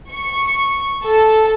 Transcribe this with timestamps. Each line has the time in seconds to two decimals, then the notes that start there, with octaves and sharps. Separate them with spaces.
0.12 C#6
1.04 A4